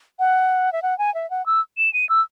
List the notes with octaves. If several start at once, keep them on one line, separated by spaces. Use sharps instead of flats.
F#5
E5
F#5
G#5
E5
F#5
E6
E7
D#7
E6